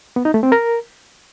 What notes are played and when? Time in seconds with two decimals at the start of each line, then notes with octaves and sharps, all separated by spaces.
0.16 B3
0.25 D#4
0.34 A3
0.43 C4
0.52 A#4